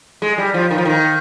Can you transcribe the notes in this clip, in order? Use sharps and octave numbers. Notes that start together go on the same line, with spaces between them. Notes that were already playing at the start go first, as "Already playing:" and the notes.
G#3
G3
F3
D#3
F3
D#3